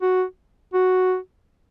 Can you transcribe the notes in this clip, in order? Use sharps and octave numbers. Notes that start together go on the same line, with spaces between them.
F#4
F#4